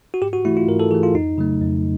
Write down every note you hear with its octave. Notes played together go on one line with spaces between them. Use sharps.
F#4
G#2 G4
F#4
E3 A3 E4
F4
G#2 A#4
A4
E3 A3 G#4
F4
F2 D#4
C#3 F#3 A3
F2